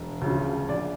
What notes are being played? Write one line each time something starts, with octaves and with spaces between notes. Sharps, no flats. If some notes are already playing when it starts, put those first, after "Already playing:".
Already playing: E1
D2 C#3 F3
A#1 D5